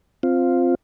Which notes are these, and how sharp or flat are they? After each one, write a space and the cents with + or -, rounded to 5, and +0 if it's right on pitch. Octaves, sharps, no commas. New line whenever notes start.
C4 +0 F4 +0